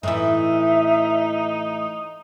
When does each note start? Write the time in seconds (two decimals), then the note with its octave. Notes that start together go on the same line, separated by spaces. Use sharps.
0.03 A2 E3 D#4 E4 E5